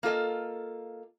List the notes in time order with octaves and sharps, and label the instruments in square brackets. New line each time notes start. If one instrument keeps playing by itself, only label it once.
[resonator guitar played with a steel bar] A#3 F4 A4 D#5